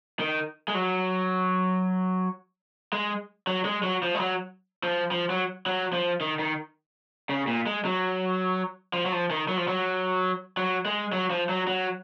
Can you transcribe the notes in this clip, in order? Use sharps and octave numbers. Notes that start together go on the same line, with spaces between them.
D#3
G#3
F#3
G#3
F#3
G#3
F#3
F3
G#3
F#3
F3
F3
F#3
F#3
F3
D#3
D#3
C#3
A#2
G#3
F#3
F3
F#3
F3
D#3
F#3
F3
F#3
F#3
G#3
F#3
F3
F#3
F#3